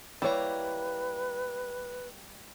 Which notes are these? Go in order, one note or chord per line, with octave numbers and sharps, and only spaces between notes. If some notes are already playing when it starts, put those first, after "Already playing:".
G3 A#3 E4 B4 C#5 A#5